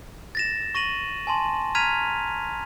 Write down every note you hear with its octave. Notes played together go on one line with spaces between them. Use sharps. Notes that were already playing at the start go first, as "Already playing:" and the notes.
A6 A#6 E7
C#6 A#6 D#7 F#7
G#5 A5 C6
A#5 F6 G#6 B6 D#7 F7